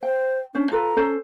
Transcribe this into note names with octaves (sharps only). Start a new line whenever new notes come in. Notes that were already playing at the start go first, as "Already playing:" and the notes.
C5 G5
C#4 D4 C5
F4 A4 B4 A#5
C#4 A4 C5